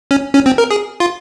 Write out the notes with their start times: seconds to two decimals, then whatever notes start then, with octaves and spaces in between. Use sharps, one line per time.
0.11 C#4
0.34 C#4
0.46 C4
0.58 A#4
0.71 G#4
1.00 F4